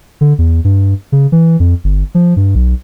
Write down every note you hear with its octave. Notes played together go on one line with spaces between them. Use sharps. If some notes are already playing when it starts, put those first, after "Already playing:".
D3
E2
G2
C#3
E3
F2
G1
F3
G2
B1